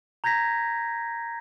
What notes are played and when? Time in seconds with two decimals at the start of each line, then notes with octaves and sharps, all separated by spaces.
0.24 A#5 G6 G#6 A#6 B6